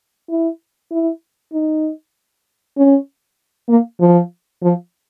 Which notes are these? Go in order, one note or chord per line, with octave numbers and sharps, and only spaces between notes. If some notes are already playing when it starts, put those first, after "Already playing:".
E4
E4
D#4
C#4
A#3
F3
F3